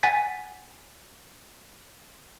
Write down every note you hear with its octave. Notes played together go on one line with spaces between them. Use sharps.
F#5 G#5 A6 B6